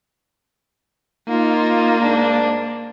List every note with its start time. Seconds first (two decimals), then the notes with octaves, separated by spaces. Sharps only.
1.28 A#3 D#4 F4
1.99 G#2 D4